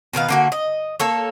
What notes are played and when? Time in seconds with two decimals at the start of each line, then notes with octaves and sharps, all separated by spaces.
0.13 B2 D#3 B4 F5
0.29 D3 A#3 F#4
0.52 D#5
1.00 A#3 A4 C#5